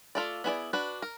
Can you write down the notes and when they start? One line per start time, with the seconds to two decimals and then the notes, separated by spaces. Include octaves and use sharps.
0.15 A3 D4 F4 A4 D5
0.44 B3 E4 G#4 B4 D5
0.73 D4 F#4 B4
1.02 A#4